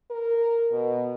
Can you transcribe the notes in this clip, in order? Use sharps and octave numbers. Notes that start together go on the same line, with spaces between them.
A#4
B2